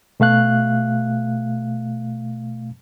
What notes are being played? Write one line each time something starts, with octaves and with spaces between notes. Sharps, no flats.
B2 A3 F5 F#6